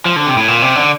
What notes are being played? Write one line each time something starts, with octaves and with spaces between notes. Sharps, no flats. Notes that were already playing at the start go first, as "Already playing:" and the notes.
F3
D3
C3
A2
A#2
C3
D3